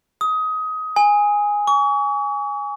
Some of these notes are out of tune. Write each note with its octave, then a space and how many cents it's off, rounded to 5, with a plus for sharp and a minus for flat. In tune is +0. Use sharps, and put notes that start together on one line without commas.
D#6 +20
G#5 -10
C#6 +40